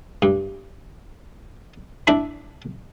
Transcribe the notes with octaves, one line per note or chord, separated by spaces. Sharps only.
G2
D4 E4 E5 B5